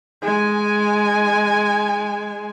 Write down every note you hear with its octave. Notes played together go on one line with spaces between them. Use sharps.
G#3 G#5